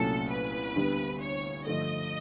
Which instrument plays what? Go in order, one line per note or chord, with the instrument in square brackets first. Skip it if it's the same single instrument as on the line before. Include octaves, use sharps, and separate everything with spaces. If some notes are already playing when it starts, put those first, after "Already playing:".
Already playing: [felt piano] C2 A#2 F#3 A3 C#4 [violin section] A4
[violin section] B4
[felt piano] D2 D3 G3 B3
[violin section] C#5
[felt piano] G2 D3 F3 A3 [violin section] D#5